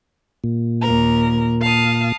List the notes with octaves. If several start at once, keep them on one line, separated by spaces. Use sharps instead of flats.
A#2
D#2 A#4
F5 A5 D#6